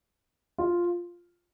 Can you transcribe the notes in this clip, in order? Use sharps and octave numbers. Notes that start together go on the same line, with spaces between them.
F4